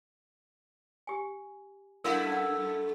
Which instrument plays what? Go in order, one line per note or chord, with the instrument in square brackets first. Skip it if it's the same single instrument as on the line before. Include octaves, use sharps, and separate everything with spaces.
[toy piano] G4 G#5
[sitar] F#2 A3 E4 [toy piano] A#4 F5 F#5
[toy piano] C#4 F#5